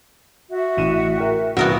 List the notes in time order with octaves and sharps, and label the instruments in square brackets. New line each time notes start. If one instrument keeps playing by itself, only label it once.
[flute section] F#4 E5
[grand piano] A1 D#7 E7
A#4 G5
[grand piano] D1 [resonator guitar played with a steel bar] A#2 F#4 [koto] B3 A#4 E5